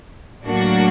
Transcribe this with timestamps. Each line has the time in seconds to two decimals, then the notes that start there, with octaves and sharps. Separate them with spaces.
0.44 A2 F#3 A#3 D4 F#4